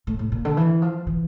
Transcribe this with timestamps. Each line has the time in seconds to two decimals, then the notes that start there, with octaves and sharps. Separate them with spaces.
0.07 A2
0.19 A2
0.32 A#2
0.45 D3
0.57 E3
0.82 F3
1.07 E3